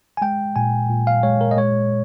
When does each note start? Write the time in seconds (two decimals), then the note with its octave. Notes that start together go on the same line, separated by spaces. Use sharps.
0.17 G#5
0.22 G#3 G5
0.56 A#2 G#5
0.89 A#2
1.07 F5
1.23 G#3 C#5
1.41 A#4
1.51 D#5
1.57 G#3 C#5